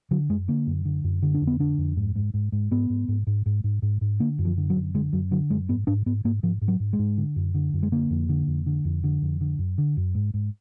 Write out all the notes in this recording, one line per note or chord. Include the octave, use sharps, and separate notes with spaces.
D3 F#3
F#2 G#3
D3 A#3
F#2
D3
F#2
D3
D4
F2
B3
D3 D4
F2
G#2
G#2
G#2
G#2
G#2 B3
G#2
G#2
G#2
G#2
G#2
G#2
G#2
D3 A#3
F#2
F3
D3
F#3
F#2
D3 G#3
F#2 F#3
D3 F#3
F#2 G#3
G#2 B3
G#2 D4
G#2 B3
G#2 A#3
G#2 F3
G#2
F#3
G#2
G#3
G#2
D3
F#2
D3
F#2
G#3
D3 A#3
F2
D3
F2
D3
F2
D3
F2
D3
F#2
D3
F#2
G#2
G#2